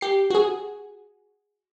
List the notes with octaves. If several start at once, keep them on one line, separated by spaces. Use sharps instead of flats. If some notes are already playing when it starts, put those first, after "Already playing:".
G4 C7
F#4 G#4